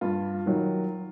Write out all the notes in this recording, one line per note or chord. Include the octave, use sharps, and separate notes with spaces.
G2 F4
D#3 F#3